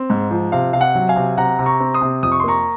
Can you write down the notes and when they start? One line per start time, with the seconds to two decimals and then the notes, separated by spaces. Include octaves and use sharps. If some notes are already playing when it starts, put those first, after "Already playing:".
Already playing: C4
0.10 G#2
0.31 F3
0.52 C3 F5
0.73 C3 F5
0.81 F#5
0.95 F#3
1.09 F5 G#5
1.16 C3
1.37 C3 F#5 A#5
1.59 C3
1.66 A#5 C#6
1.80 C4
1.94 C6 D#6
2.01 C3
2.23 F2 D#6
2.32 C#6
2.40 C6
2.44 A#3 A#5 C#6